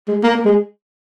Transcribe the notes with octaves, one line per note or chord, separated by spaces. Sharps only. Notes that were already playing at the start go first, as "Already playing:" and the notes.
G#3
A#3
A#3
G#3